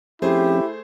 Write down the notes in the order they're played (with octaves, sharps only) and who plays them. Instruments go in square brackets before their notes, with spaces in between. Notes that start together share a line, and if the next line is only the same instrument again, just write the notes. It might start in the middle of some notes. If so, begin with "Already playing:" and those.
[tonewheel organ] F3 C4 C#4 [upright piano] A3 G#4 C5 [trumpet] E4 [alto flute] G4